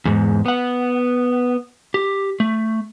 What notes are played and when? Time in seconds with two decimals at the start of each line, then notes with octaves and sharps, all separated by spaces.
0.05 E2 G#2
0.46 B3 F#5
1.94 G4
2.40 A3